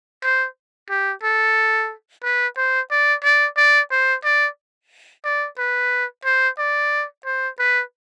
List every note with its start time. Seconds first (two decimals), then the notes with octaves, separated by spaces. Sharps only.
0.24 C5
0.90 G4
1.23 A4
2.24 B4
2.57 C5
2.91 D5
3.24 D5
3.57 D5
3.91 C5
4.24 D5
5.25 D5
5.58 B4
6.25 C5
6.58 D5
7.26 C5
7.59 B4